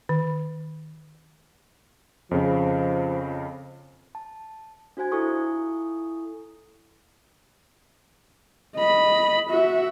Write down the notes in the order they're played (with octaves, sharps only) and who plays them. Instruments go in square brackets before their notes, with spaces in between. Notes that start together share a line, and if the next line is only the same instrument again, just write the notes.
[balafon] D#3
[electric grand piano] F2 C#3 [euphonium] F3
[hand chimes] A5
D4 F#4 C5 G#5 G#6
E4 F4 A4 G#5 C#6 D#6
[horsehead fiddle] D#5 B5
F#4 E5